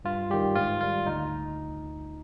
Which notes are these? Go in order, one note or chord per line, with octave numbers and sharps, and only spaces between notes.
G2 F4
D#3 G3 G4
G#2 F4
D#3 G3 F4
D2 D#4